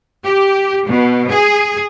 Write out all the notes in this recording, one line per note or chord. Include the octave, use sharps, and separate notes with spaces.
G4
B2
G#4